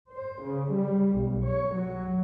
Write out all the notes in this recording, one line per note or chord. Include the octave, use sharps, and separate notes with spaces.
C5
C#3
G3
B1
C#5
F#3